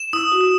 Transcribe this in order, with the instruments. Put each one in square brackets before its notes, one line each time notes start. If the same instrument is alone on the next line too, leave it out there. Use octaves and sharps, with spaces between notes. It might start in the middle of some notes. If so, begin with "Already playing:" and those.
Already playing: [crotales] E7
[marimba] E4 [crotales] D#6
[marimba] F#4
[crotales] D#6